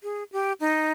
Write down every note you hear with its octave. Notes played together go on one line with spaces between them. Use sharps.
G#4
G4
D#4